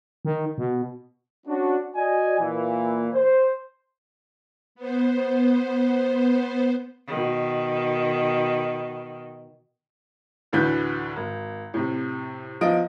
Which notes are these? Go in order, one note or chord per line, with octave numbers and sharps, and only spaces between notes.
D#3
B2
C#4 D4 F#4
F#4 D5 D#5 G#5
A#2 E3
C5
B3 C5
B2 D#3
D2 A2 D3 E3 B4 G6
G#1
A2 C3
E2 F3 F4 D#5 D7